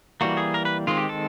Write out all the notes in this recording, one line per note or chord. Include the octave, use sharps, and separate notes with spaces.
E3 G3 A#3 F#4
G#4
A#4
B4
D#3 G#3 C4 F4
G4
A4